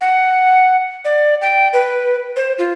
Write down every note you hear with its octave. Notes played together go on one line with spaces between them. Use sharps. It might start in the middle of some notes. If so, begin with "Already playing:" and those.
F#5
D5
G5
B4
C5
F4